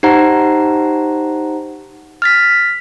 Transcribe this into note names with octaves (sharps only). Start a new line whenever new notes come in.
D#4 G4 C5 F#5 A#5
F6 A6 B6